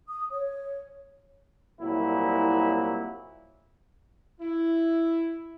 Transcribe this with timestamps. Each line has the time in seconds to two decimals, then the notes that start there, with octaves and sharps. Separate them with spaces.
0.08 D#6
0.31 C#5
1.80 C2 A#2 F#3 E4
4.40 E4